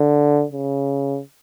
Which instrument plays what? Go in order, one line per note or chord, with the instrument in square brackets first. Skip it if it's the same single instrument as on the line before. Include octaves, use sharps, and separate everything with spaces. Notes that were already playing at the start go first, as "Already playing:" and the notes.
Already playing: [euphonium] D3
C#3